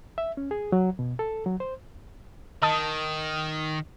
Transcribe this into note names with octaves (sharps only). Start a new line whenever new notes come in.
E5
C#4
G#4
F#3
B2
A4
F#3
C5
D#3 D#5 A5 D#6